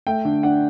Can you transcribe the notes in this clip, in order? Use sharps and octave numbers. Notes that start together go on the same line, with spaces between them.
A3 G5
D3
D4 F#5